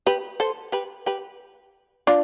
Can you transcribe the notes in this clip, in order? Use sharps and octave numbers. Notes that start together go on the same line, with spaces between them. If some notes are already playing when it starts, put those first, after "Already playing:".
G4 B4
A4 C5
G4 B4
G4 B4
D4 F4